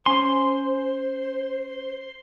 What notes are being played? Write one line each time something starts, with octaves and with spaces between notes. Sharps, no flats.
C#4 C5 G#5 C6